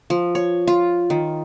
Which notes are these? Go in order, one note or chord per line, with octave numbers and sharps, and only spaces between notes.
F3
C#5
F4
D#3